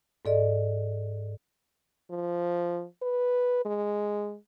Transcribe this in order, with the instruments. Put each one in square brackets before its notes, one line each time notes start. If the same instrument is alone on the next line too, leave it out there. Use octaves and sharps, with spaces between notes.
[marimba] G#2 A4 D5 D#5
[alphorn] F3
B4
G#3